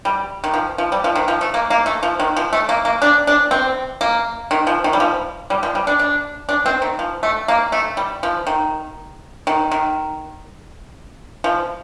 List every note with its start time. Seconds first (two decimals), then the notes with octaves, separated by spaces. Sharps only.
0.05 G3
0.44 D#3
0.54 F3
0.78 F3
0.92 G3
1.04 F3
1.16 D#3
1.28 F3
1.41 A3
1.54 A#3
1.70 A#3
1.86 A3
2.03 F3
2.20 D#3
2.36 F3
2.53 A3
2.69 A#3
2.85 A#3
3.02 D4
3.27 D4
3.51 C4
4.01 A#3
4.51 D#3
4.67 F3
4.84 D#3
4.93 G3
5.00 F3
5.50 G3
5.63 F3
5.75 G3
5.87 D4
5.99 D4
6.49 D4
6.66 C4
6.82 D#3
6.99 F3
7.23 A3
7.48 A#3
7.72 A3
7.97 G3
8.23 F3
8.47 D#3
9.47 D#3
9.71 D#3
11.44 F3